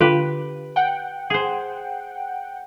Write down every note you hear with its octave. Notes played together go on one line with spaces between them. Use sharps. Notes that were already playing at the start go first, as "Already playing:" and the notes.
D3 F4 G4 B4
F#5 G5
G#4 C5